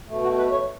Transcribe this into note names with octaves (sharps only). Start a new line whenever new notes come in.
B2 A3
F#4
B4
C#5